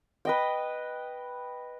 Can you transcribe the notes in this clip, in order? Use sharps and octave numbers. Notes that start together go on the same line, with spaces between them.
B4 D#5 G5